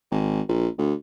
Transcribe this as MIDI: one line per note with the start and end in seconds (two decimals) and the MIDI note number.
0.11 0.41 32
0.48 0.68 34
0.78 0.94 38